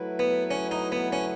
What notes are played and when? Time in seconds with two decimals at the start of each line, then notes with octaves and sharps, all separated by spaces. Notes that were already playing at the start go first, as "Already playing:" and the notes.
Already playing: F#3 A3 E4 B4
0.19 B3
0.51 C#4
0.71 D#4
0.92 B3
1.12 C#4